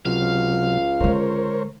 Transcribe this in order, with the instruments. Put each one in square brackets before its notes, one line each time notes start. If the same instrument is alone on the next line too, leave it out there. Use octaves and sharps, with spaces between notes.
[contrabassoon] C#2 [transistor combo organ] C3 F#3 [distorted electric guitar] F5
[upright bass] D3 G#3 [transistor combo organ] A#4 C5 C#5